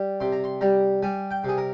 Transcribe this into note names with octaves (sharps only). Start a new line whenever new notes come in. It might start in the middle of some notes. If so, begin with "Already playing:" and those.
Already playing: G3
C3 C6
A#5
C6
G3 A#5
G3 G#5
G5
C3 G#4
A#4